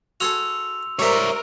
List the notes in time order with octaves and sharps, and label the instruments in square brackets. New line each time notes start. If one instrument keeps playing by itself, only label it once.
[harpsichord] F#4 G#4 A4 [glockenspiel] C6 E6 F7
[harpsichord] G3 C5 [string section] A#4 [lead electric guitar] C#5 E5